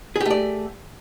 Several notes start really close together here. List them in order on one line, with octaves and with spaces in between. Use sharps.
G#4 G4 A3 D5